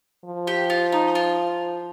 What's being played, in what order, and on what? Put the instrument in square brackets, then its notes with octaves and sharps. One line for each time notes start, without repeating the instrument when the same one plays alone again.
[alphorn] F3
[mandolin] G4
F4
D#4
F4